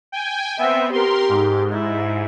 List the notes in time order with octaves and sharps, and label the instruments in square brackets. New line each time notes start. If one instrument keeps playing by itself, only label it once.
[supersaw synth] G5 G#5
[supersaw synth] B3 C4 [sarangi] E5
[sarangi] G4 [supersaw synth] A#4 C6
[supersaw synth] G#2
[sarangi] E4